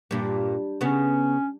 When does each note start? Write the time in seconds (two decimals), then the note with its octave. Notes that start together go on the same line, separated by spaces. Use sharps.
0.11 G2 A#2 G3 D4
0.81 C#3 B3 C#4